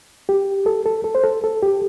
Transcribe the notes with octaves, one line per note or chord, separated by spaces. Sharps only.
G4
A4
A4
A4
C5
A4
A4
G4